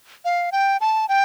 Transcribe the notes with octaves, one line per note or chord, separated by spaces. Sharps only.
F5
G5
A5
G5